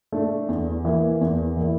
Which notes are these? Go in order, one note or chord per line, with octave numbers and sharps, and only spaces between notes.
A3 D4
E2
E3 A#3 E4
E2
E3 A#3 E4